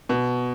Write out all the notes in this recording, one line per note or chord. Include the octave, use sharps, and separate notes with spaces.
B2